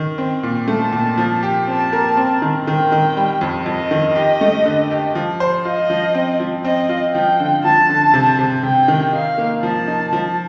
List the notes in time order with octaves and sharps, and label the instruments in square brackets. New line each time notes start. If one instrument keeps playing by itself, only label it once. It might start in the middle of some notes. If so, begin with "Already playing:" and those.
Already playing: [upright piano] D#3
C4
A#2
[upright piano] A3 [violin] A5
[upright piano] A#2
F3
G4
[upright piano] C4 [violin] A5
[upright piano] A#4
C4
D#3
[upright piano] D#3 [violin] G5
[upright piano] D#3
G3
F2
[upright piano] F2 [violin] D#5
[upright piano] D#3
G4
A3
D3
G4
F3
C5
[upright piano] F4 [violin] D#5
[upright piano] F3
C4
F3
[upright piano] C4 [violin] D#5
[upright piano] F4
[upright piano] F3 [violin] G5
[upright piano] D3
[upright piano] F3 [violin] A5
[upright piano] D3
C3
C3
[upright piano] C3 [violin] G5
[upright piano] D#3
[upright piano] D#4 [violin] F5
[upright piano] A#3
[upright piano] F3 [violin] A5
[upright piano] D#4
F3